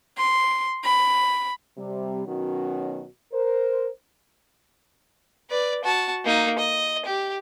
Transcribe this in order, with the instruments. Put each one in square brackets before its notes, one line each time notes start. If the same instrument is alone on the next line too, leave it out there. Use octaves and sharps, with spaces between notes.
[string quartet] C6
B5
[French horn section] C3 G3
B2 D#3 F#3 C#4 F#4
A#4 C5
[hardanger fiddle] B4 D5
F#4 A5
A#3 D#4
D#5
G4